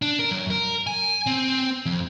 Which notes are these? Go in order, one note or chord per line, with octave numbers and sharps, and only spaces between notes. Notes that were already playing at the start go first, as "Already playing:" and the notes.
D4
A#4
F#2
A#4
G#5
C4
F2